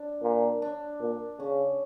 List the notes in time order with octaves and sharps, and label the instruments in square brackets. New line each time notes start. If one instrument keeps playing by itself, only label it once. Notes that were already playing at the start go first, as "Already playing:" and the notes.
Already playing: [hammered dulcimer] D4
[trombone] A#2
[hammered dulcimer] D4
[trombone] A#2
[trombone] C#3 [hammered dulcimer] C#4